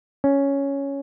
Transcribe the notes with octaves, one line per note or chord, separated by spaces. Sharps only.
C#4